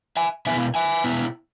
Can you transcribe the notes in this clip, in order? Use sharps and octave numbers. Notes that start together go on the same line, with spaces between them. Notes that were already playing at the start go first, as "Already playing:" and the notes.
E5 G#5
B2 B3 E4 E5 G#5
E5 G#5
B2 B3 E4